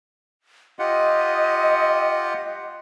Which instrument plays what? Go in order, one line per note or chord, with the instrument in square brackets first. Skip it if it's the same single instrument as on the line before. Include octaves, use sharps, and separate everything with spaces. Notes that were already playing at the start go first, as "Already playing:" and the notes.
[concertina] F4 G4 F#5 [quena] D#5